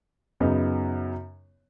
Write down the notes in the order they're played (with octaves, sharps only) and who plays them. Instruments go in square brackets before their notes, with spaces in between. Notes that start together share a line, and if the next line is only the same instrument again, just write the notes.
[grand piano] F#2 C#3 F#3 B3 D#4